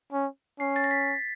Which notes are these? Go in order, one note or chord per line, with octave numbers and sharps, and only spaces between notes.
C#4
C#4 C7
A6
A#6
B6